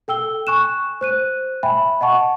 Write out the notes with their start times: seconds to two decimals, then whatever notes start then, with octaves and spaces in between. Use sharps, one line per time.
0.08 A4 G5 E6 G7
0.47 G#5 C#6 F#6 E7
1.01 C5 F#6 D#7
1.63 E5 G5 G#5 B5
2.01 D#5 F#5 A5 C#6